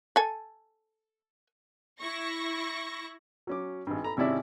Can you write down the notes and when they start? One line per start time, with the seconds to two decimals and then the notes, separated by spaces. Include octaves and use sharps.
0.16 A4 G#5
2.00 E4 C#6 A#6
3.47 F#3 C#4 D6
3.87 G#1 G2
4.03 A4 A#5 B5
4.17 G#1 C3 C#4 E4 D5 E5